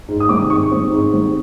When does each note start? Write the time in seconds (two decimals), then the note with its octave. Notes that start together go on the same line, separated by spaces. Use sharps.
0.08 G#2
0.20 D#6
0.29 D#3 G3 C4 D6
0.50 G#2 C#6
0.71 D#3 G3 C4
0.91 G#2
1.13 D#3 G3 C4